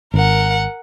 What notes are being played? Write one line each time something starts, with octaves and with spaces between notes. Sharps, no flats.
G#1 A#4 F#5